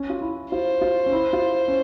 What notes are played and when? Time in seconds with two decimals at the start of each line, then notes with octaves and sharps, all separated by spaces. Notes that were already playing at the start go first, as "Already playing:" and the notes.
Already playing: C#4
0.10 F4
0.21 E4
0.51 F4 C5
0.81 F4
1.06 C#4
1.12 E4
1.33 F4
1.68 C#4